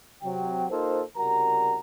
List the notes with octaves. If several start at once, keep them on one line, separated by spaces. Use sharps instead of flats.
C3 F#3 G5
A#3 D#4 F4 A4 A#4 C5
C2 C#3 G3 F#4 A#4 A#5